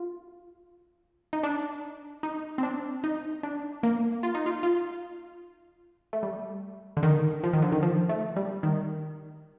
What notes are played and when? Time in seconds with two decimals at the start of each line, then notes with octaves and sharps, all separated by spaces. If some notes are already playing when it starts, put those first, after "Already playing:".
Already playing: F4
1.33 D#4
1.43 D4
2.23 D#4
2.58 C4
2.63 D4
3.04 D#4
3.43 D4
3.83 A#3
4.23 F4
4.35 D#4
4.46 F4
4.63 F4
6.13 A3
6.23 G3
6.97 D3
7.03 D#3
7.44 F3
7.53 D#3
7.62 D3
7.72 D#3
7.83 F3
8.09 A3
8.36 G3
8.63 D#3